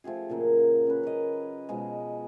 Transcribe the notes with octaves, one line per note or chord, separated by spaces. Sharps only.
F3 A3 G4 G#4
A#2 C#3 F#3 A#3
C#4 B4
A#4 B4 D#5
B2 F3 G#3